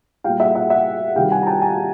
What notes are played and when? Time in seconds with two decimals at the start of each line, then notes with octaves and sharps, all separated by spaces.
0.24 A#2 G3 F5 G5
0.40 E5 F#5
0.55 E5 F#5
0.70 E5 F#5
1.16 C3 D#3 G3 F5 G5
1.32 F#5 G#5
1.43 A#5
1.46 G5 A5
1.62 G#5 A#5